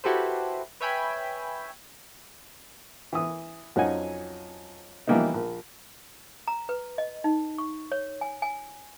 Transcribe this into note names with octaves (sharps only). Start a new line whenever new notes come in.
E4 F#4 G4 A4 B4 C5
B4 C#5 E5 G5 G#5 B5
E3 D#6
F2 F#3 C#4 D#4 F#5 G#5
E3 F3 G3 A#3 B3 D#4
A#1
A#5
B4
D#5
D#4
C#6
C#5
G#5
G#5